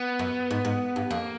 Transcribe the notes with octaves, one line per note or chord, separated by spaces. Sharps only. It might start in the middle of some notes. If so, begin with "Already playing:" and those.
Already playing: B3
F#2
G#2
G#2
G2
F2 A#3